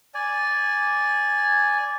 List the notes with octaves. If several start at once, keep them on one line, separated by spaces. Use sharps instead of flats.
D5 G#5